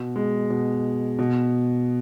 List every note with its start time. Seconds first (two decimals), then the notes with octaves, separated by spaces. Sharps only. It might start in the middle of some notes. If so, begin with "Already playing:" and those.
Already playing: B2
0.16 G#3
0.50 B2
1.19 B2